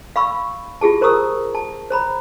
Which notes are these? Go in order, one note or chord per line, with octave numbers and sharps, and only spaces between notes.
F5 B5 C#6 E6
F4 G4 G#4 A5
A#4 C5 A#5 C#6 D#6 E6
A5
C5 A#5 B5